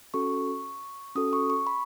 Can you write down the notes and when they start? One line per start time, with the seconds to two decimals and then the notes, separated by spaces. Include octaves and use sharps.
0.14 C#4 F#4 A4 C#6
1.15 C#4 F#4 A4 D#6
1.33 C#6
1.50 C#6
1.67 B5